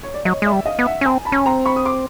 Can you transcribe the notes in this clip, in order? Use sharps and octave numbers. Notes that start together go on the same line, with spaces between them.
C#5
D5
F#3 C#5 D#5
G#3 D5 E5
G3
D#5 F5
B3
E5 F#5
C#4
C4 G#5 A#5
A5 B5
C#4
C4 A#5 C6
B5 C#6
D#6
C6 D6